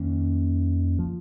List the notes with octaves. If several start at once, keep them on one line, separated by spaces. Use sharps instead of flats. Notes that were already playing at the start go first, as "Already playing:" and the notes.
Already playing: F2 D#3 A#3 C#4
F3